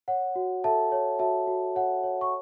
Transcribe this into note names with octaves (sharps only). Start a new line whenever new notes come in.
C#5 F#5
F#4
A4 E5 A5
C#5
F#4 E5 A5
F#4
C#5 F#5
C#5
C#6